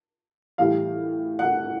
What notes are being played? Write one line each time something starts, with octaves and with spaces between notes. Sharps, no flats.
A2 E3 G3 F5
F#5